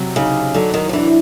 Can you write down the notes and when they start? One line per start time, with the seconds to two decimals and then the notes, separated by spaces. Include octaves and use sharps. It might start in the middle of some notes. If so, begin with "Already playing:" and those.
Already playing: C3 F#3
0.16 C#3 D#4
0.54 D3 F#3
0.74 D#3
0.89 F3
0.93 E3 D4